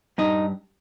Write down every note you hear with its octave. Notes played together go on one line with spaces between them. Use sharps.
G2 D#4